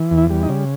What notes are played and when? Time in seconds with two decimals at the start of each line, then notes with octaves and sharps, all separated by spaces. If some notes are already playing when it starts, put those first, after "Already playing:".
Already playing: E3
0.11 E2
0.18 E4
0.30 G3
0.43 D#4
0.49 C#3